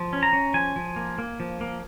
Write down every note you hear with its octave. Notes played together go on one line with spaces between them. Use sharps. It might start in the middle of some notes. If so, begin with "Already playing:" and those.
Already playing: F3
C#4
A#5
C#4
F3 G#5
F3
A#3
A#3
F3
A#3